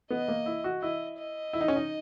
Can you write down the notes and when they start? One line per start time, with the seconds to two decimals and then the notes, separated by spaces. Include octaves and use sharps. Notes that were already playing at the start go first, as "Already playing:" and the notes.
0.10 B3 D#5
0.28 A#3
0.46 E4
0.64 F#4
0.82 E4 D#5
1.18 D#5
1.53 E4
1.61 D#4
1.68 C#4
1.76 D#4